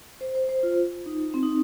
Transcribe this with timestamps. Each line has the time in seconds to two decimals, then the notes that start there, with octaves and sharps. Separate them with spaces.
0.21 C5
0.35 C5
0.49 C5
0.63 F4
1.06 D#4
1.34 C4
1.43 D#4